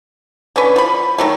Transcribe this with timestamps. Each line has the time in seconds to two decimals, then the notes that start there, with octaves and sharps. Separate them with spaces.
0.56 D3 C#4 B4
0.76 F3 B5
1.18 D#3 F#3 A3